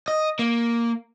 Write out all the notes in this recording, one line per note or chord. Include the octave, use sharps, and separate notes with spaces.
D#5
A#3